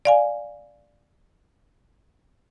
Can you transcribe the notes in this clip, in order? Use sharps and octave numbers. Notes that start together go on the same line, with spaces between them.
D5 F5 G#5